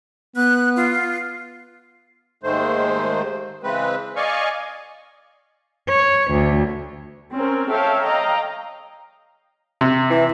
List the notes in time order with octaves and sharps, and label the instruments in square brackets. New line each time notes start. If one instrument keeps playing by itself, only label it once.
[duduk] B3 [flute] F#6
[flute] F4
[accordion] D#2 G#2 D#3 G#3 A3 C5
C#3 E3 G#3 C4 B4
D5 D#5 F5 G#5 C#6
[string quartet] C#5
D2
[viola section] C4 C#4 A#4
A4 C#5 E5 F5 G5 A5
D#5 F5 G5 A#5
[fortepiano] C3
[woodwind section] E3